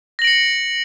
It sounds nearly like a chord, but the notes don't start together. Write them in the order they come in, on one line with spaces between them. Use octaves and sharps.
A#6 F#7 D7 C#7